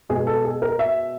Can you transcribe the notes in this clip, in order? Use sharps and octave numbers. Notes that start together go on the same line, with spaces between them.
B2 G#3 B3 G#4
A4
G#4
A#4
E5